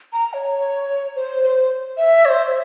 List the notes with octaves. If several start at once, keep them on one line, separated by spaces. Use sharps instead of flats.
A#5
C#5
C5
C5
E5
C#5
C5